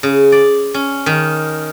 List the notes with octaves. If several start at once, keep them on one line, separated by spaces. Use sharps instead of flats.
C#3
D5
C#4
D#3